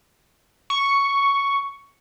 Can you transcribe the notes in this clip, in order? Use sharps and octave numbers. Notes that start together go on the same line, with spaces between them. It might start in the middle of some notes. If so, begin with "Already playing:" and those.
C#6